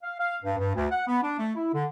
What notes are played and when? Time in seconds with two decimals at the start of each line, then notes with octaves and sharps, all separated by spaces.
0.03 F5
0.19 F5
0.44 G2
0.58 G2
0.76 D2
0.91 F#5
1.07 B3
1.22 D4
1.39 A3
1.55 E4
1.74 D3